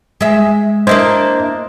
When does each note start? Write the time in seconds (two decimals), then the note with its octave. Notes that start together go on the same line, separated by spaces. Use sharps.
0.21 G#3 E5
0.87 A#3 D4 E4 C5 D#5 E5